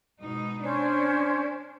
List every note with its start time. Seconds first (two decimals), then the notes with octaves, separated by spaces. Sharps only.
0.21 G#2 B2 D#4
0.62 C#4 D4 C5